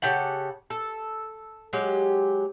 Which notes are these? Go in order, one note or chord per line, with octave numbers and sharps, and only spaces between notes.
C#3 G4 A4 F#5
A4
F#3 G#3 G4